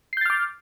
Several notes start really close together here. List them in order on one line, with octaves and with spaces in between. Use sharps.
C7 G6 A6 F6 D6